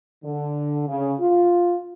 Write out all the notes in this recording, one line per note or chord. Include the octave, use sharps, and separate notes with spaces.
D3
C#3
F4